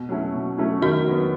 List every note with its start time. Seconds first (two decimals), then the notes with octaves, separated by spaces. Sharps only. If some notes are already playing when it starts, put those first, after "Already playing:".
Already playing: B2
0.09 F#3 A3 C#4 E4
0.33 B2
0.58 F#3 A3 C#4 E4
0.82 D#3 F#4
1.06 F#3 B3